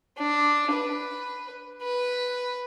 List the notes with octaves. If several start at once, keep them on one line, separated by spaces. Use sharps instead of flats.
D4
B4
B4